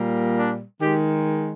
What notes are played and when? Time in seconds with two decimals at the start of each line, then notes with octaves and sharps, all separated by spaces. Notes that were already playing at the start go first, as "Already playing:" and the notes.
Already playing: A#2 G3 A#3
0.35 D4
0.81 D#3 G#3 G4